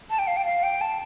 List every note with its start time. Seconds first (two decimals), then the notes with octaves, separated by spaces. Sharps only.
0.10 A5
0.19 G5
0.27 F5
0.37 G5
0.46 F5
0.63 G5
0.81 A5